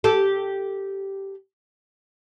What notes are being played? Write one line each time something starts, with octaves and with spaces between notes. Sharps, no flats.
G4 A4